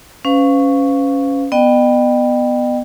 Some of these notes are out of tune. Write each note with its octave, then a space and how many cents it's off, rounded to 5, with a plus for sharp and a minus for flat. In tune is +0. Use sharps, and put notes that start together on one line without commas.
C#4 +0 B4 +45 F5 +0
B3 +0 D#5 -45 G5 +0